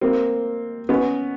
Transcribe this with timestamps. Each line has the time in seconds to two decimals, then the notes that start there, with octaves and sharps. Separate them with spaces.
0.01 A#3 C4
0.89 B3 C#4